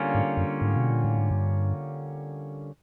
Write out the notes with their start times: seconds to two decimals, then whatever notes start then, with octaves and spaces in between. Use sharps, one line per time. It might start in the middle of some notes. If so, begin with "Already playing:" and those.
Already playing: D3 G3 A#3 C#4 F4
0.15 G#2
0.37 F#2
0.61 G#2
0.77 B2
0.91 A#2
1.05 A2
1.18 G#2
1.31 G2